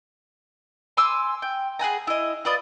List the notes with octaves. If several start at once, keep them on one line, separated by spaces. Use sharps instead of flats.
G#5 C6 D6 E6
G5
G#4 F#5 G#5 A#5
E4 D#5
F4 B4 D5 D#5